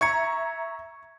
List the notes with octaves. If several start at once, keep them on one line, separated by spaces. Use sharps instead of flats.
E5 A#5 C#6 G#6 C#7